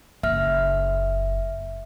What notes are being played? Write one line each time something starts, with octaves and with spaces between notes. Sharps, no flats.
F#1 E5 F6